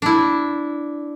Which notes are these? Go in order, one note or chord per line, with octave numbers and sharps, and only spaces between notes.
D4 E4